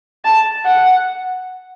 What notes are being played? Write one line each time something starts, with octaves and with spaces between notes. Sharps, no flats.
A5
F#5